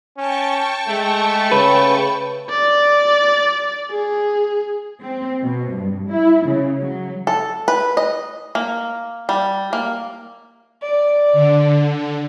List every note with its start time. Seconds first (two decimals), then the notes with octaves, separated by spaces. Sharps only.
0.17 C#4 G5 A5 C#6
0.88 G#3 A3
1.52 C#3 B4
2.50 D5
3.91 G#4
5.02 C4
5.42 B2
5.73 G2
6.09 E4
6.45 C#3
6.80 F#3
7.27 A4
7.68 B4
7.97 D#5
8.55 A#3
9.29 G3
9.73 A#3
10.82 D5
11.33 D3